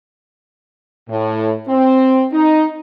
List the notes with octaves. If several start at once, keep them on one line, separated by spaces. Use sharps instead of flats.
A2
C4
D#4